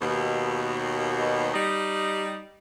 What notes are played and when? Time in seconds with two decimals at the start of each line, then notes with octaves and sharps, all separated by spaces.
0.01 D#2 B2
1.54 G3 D#4